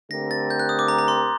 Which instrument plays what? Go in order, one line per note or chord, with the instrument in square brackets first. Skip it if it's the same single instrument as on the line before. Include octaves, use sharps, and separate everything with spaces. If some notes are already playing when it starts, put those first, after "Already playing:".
[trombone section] D3 A3 C4 G4 A#4 [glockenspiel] A#6
[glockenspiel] A6
G6
F#6
D#6
D6
A#5
A#5
C6